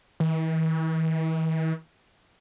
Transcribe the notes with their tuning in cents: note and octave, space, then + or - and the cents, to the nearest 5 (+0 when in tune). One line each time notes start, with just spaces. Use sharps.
E3 -45